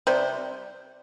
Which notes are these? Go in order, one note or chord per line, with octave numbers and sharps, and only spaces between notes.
C3 G3 C5